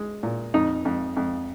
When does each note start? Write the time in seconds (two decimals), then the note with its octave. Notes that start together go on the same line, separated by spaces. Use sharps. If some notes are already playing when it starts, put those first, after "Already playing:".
Already playing: G#3
0.23 A#2
0.54 F2 D#4
0.85 F2
1.17 F2